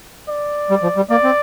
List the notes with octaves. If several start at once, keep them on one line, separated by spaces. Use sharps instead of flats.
D5
G3
F3
G3
A#3 D5
C4